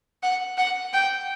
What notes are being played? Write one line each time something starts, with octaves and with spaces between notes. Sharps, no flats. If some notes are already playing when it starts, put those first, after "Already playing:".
F#5
F#5
G5